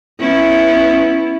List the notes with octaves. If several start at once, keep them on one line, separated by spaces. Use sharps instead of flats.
B3 C#4 E4